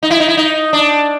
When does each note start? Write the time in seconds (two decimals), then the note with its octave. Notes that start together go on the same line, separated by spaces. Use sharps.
0.03 D#4
0.11 E4
0.20 D#4
0.28 E4
0.37 D#4
0.73 D4